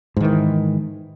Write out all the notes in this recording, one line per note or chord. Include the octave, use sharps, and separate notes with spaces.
G#2 D#3 E3